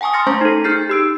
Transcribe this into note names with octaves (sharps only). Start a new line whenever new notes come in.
F#5 G#5 A5 C#6 D#6
C6 D#6 F6 A6 A#6 C#7
A3 C#4 C5 A#5 C#6 A#6
D#4 A4
D#4 G#4 F6 G6 A6 C7
G4 E6 D7